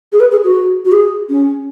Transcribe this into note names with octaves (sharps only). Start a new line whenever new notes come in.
G#4
B4
G#4
F#4
F#4
G#4
C#4